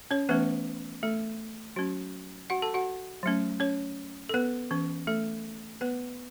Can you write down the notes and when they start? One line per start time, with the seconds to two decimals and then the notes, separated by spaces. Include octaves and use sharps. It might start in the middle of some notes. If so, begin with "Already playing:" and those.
0.11 C#4 C#5
0.29 E3 A3 B3 C#4 B4
1.03 A3 A4
1.76 F#3 C#4 F#4
2.50 F#4 F#5
2.62 A4 A5
2.74 F#4 F#5
3.23 F#3 A3 C#4
3.60 C#4 C#5
4.29 A4
4.34 B3 B4
4.71 E3 C#4
5.07 A3 A4
5.81 B3 B4